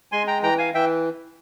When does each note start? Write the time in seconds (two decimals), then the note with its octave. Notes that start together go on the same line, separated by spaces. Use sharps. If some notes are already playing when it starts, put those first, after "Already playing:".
0.12 G#3 G#5 C6
0.27 G5 A#5
0.43 E3 G5 A#5
0.58 F5 G#5
0.74 E3 E5 G5